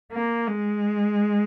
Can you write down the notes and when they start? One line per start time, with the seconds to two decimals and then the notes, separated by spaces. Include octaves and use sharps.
0.12 A#3
0.47 G#3